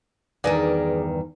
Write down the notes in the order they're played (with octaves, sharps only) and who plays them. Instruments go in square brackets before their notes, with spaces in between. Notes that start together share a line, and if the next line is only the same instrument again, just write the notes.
[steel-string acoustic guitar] E2 G2 D#3 [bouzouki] G#4 A#4 D5